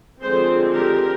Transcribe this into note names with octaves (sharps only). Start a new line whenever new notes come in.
D3 F3 G#3 C4 G#4 C5
G4 A#4